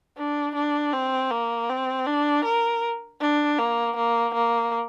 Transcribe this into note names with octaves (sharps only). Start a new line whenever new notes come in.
D4
D4
C4
A#3
C4
D4
A#4
D4
A#3
A#3
A#3